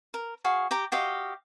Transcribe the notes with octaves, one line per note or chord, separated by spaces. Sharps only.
A#4
F#4 G#4 F5
G4 A#5 D6
F#4 G4 D#5 F5